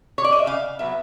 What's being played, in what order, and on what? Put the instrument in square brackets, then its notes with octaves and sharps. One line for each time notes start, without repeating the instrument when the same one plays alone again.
[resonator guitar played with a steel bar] C#5
D5
D#5
E5
C#3 F5
F#3 B3 E5